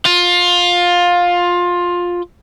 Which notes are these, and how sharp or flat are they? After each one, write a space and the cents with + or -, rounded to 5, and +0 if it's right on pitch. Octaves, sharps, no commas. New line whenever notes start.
F4 +15